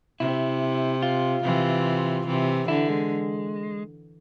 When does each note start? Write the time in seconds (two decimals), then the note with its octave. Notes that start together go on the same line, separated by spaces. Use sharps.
0.20 C3 E4
1.03 F4
1.44 C3 E3
2.27 C3 E3
2.68 D3 E4
2.89 G#3